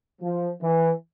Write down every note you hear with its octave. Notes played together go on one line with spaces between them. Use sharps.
F3
E3